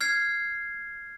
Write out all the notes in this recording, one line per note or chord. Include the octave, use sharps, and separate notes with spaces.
F6 G#6 C7